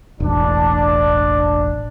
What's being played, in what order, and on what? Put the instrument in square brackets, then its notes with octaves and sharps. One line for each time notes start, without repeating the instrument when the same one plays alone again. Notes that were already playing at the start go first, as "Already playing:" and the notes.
[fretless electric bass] E1 A1 [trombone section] D4